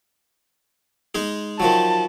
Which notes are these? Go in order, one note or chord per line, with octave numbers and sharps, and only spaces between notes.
G#3 D#4 G#4
D#3 F3 F#3 A5